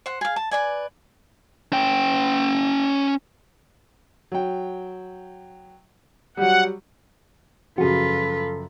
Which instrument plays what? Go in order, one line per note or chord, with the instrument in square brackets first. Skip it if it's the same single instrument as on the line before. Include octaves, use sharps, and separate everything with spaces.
[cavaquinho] C5 F#5
G#4 F5
A5
B4 D5 G#5
[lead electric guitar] C#4 G5
[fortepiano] F#3 G5
[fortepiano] F#3 G3 [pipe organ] F#5
[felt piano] F#2 C#3 F3 [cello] F4 B4 [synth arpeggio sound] F#4 G#4 [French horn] A4